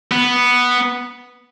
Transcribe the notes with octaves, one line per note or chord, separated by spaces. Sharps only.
B3